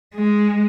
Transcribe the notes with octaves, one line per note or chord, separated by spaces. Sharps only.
G#3